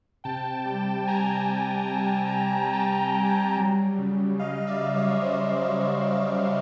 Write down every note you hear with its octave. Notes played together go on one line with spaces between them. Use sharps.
C3 G5 A5
G3 G5 A5
C3 G#5 A#5
G3
C3
C3
G3 G5 A5
G3
F#3
C#3
C#3 D#5 F5
D5 E5
F#3
C#5 D#5
D#5
F#3 C5 D5
F#3
F#3